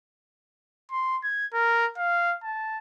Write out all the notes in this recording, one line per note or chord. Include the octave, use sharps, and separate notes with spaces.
C6
G#6
A#4
F5
A5